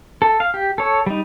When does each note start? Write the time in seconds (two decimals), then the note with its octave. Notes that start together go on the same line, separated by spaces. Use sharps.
0.22 A4
0.40 F5
0.54 G4
0.78 A4 C#5
1.06 G3 D#4